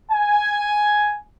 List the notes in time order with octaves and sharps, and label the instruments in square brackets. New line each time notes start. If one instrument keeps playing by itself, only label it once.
[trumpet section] G#5